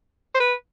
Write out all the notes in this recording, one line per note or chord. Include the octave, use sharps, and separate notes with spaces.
C5
B4